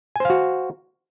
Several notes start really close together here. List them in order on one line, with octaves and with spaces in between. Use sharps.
G#5 C5 F5 F#4